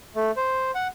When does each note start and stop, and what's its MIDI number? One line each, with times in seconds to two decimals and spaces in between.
0.15 0.31 57
0.37 0.71 72
0.75 0.88 78